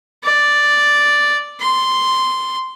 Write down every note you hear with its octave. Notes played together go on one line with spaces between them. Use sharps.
D5
C6